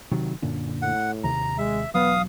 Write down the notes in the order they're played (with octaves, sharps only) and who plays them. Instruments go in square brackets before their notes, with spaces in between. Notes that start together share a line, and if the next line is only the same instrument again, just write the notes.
[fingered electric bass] C3 D#3 F#3
F#2 A#2 D3
[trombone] A2 [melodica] F#5
[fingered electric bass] D#2 C3 [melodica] A#5
[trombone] G#3 [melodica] E5
[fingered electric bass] E1 F#3 [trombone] B3 [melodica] F5 D#6